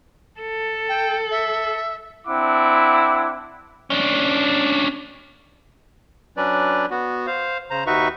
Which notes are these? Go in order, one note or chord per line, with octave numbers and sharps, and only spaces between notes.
A4
G5
E5
C4 D4 E4 F#5 D6
C#4 D4
F#3 C#4 D4 B4 D5
B3 F#4
C5 F5
C#3 C5 A#5
D#2 D#4 F#4 B4 E5 C#6